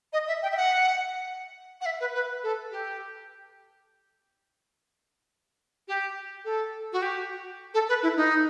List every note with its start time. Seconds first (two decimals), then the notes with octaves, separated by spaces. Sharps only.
0.12 D#5
0.27 E5
0.42 G5
0.51 E5
0.56 F#5
1.80 F#5
1.85 E5
2.00 B4
2.14 B4
2.43 A4
2.71 G4
5.87 G4
6.44 A4
6.92 F#4
7.01 G4
7.73 A4
7.88 B4
8.02 E4
8.16 D#4